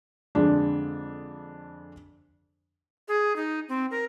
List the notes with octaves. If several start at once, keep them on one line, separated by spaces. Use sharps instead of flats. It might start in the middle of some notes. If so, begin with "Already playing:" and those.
F2 D3 G#3 D4
G#4
D#4
C4
A#4